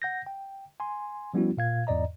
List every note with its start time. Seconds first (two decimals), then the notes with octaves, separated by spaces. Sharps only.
0.02 F#5 G6 A#6
0.26 G5
0.80 G#5 C6
1.34 F3 G3 B3 C#4 E4 F#4
1.57 A#2 F5 G#6
1.87 E2 G#2 D5 D#5 A#5